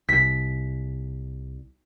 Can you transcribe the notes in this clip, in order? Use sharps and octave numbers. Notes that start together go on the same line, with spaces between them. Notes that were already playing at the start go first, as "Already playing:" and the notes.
C2 B6